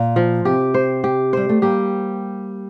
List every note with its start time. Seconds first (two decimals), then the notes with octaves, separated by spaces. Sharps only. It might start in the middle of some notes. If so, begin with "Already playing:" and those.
Already playing: A#2
0.16 F3
0.45 C3 G4
0.74 C5
1.04 G4
1.33 G3 C5
1.49 A3
1.62 G3 A#3 G4